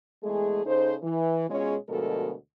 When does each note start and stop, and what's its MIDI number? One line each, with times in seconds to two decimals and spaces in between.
0.24 0.65 40
0.24 0.65 56
0.24 0.65 57
0.24 0.65 68
0.65 0.95 49
0.65 0.95 63
0.65 0.95 69
0.65 0.95 72
1.02 1.48 52
1.49 1.75 47
1.49 1.75 56
1.49 1.75 61
1.49 1.75 65
1.49 1.75 68
1.49 1.75 73
1.88 2.33 38
1.88 2.33 47
1.88 2.33 53
1.88 2.33 56
1.88 2.33 69
1.88 2.33 70